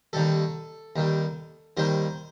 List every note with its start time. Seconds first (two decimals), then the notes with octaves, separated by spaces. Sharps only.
0.13 D#2 D#3 G3 A4
0.96 D#2 D#3 G3
1.77 D#2 D#3 G3 C5